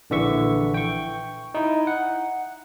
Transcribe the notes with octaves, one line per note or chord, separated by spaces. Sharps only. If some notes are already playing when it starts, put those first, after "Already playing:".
A#1 D3 E3 E5 C#6
G5 C#6
D#4 E4
F#5